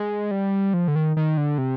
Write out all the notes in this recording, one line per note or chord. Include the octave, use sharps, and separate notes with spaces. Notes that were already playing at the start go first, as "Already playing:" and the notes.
Already playing: G#3
G3
F3
D3
D#3
D#3
D3
C3